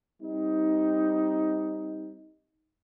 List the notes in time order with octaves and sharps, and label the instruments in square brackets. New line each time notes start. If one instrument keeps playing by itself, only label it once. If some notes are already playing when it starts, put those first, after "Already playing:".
[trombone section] G3 C4 D#4